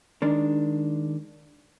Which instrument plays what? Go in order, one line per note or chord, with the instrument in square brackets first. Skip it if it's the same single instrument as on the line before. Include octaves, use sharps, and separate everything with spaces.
[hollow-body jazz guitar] D#3 G#3 D4